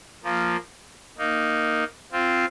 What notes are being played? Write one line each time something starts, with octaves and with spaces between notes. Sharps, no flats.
F3 A#3
A#3 D#4
C4 F4